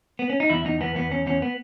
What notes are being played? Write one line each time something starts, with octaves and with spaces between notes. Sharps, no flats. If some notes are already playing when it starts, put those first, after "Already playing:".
B3
C#4
D#4
E2 E4
E2 D#4
E2 B3
E2 B3
E2 C#4
E2 C#4
B3